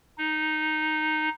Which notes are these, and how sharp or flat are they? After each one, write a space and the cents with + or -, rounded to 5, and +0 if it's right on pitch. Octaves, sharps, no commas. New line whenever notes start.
D#4 -5